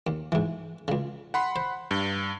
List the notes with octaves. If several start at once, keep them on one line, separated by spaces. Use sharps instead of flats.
D#2
G#2 E3
C#2 C#3
F#5 B5 C6
C5
G2